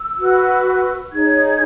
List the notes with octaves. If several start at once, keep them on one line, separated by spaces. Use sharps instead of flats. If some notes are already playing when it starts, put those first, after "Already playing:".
Already playing: E6
F#4 B4
D#4 G#4 C#5 G#6